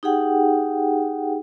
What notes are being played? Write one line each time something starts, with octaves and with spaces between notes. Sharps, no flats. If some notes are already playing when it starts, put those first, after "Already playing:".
D#4 G4 G#4 F#5 G5